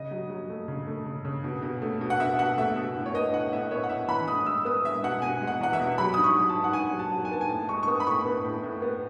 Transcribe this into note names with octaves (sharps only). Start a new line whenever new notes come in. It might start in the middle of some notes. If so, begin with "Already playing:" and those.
Already playing: C#3 D#5
F#3
F#3
A3
C#3
A3
C#3
C#3
B2
B2
A3
B2
F#5
B2 E5
B2 F#5
A3 E5
B2
A2
C#5
B3 D#5
A2 F#5
A2 E5
B3 C#5
F#5
A2 E5
E3 B5
A2 D#6
G#3 E6
B3 D#6
G#3 E5
B2 F#5
B2 G#5
G#3
F#5
E2 F#5
E5
B2
F#3 B5
G#2 D#6
C#6
F#3
A5
G#2
F#5
G#2 G#5
F#3
A5
F#3
G#5
B3 A5
G#5
A2 A5
G#3 C#6
C#6
B3 D#6
B5
A2 C#6
B3
A2
A2
B3